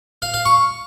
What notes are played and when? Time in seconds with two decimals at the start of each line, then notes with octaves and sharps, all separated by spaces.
0.22 F5
0.34 F5
0.45 C#6